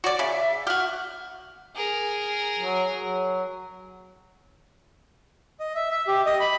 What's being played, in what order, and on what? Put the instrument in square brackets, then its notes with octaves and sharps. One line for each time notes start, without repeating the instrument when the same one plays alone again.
[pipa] F#4 C#5 D5
[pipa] C#3 [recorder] E5
[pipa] F#4 G4 [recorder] F6
[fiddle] G#4 A#4
[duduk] F#3
F#3
[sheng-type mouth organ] D#5
E5
E5
G4
D#5
B5